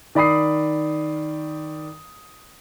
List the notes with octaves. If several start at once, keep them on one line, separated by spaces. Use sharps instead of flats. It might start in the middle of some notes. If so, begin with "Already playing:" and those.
D#3 D5 B5 D#6 C7